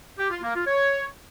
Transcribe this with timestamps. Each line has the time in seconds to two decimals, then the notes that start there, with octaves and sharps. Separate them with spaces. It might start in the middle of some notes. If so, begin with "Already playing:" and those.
0.19 G4
0.30 F4
0.42 A#3
0.54 F4
0.66 C#5